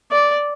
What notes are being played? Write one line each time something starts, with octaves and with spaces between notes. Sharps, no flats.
D5